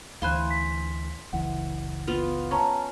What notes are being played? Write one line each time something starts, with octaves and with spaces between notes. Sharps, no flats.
D2 E3 C5 F5 G#5 B5 C6 F#6
B6
F#1 C#2 E3 F#5
B3 F4
C#4 A5 A#5 C#6